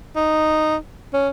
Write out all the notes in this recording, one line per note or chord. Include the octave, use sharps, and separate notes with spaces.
D#4
C#4